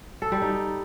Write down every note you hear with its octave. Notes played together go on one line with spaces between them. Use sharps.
A4
G3
D#4